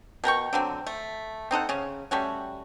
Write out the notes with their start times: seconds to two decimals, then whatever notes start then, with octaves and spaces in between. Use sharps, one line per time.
0.24 B2 A#4 G5 C#6
0.53 D3 F#3 C4
0.86 A3
1.51 C4 D#4 A4 F#5
1.69 C#3 C#4
2.11 G3 A3 C#4 F#4